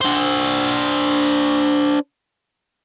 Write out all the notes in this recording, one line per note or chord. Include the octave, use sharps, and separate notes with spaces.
D4 C5